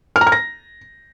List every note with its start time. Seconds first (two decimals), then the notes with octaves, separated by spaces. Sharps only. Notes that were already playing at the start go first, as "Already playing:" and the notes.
0.16 F6
0.21 A#5
0.27 F6
0.32 A#6